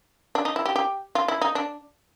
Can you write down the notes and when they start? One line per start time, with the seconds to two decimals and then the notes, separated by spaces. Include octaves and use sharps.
0.35 D4
0.45 D#4
0.56 E4
0.66 G4
0.76 G4
1.15 F4
1.28 E4
1.41 D#4
1.55 D4